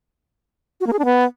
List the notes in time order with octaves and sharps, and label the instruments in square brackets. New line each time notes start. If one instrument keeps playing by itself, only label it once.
[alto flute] F#4
A#3
G#4
D4
B3